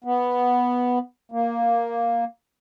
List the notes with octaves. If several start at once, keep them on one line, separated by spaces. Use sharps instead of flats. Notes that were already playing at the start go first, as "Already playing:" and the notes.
B3
A#3